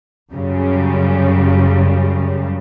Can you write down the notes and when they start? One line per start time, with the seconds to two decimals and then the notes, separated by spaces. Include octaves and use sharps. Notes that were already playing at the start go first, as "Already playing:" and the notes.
0.31 F#2 C#3 G3